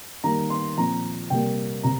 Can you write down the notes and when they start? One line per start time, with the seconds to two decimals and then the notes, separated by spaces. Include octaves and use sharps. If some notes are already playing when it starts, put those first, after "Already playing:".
0.24 D#3 G3 A#3 A#5
0.50 C6
0.77 A#2 F3 C4 A#5
1.30 C3 G3 A#3 G5
1.83 C3 A#5